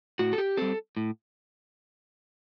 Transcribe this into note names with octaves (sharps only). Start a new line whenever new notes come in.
A2 F#4
A4
G4
G3 C4 A4
A2